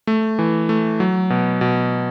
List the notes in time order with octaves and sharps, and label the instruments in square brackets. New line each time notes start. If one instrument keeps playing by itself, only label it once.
[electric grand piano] A3
E3
A3
F#3
B2
B2